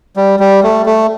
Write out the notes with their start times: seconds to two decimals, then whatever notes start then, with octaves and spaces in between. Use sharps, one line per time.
0.16 G3
0.40 G3
0.63 A3
0.86 A3